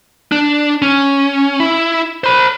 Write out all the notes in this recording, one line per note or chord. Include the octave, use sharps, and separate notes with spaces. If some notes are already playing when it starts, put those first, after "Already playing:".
D4
C#4
E4
C5 B5